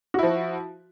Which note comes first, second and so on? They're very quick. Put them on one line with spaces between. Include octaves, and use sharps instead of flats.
F#4 E4 F3